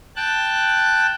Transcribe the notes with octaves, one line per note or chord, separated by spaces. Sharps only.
G5 A5 F#6